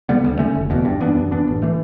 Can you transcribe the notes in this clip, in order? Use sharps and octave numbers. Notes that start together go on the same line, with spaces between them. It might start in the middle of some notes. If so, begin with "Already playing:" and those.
D3 G3 B3
D2
D3 A3 C#4
F#1
E2 B2
G2
E3 B3 D4
F#2
E3 B3 D4
A1
E3 A3